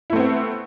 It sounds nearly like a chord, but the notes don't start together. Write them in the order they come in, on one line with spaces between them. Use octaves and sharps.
E4 A3 C4 B3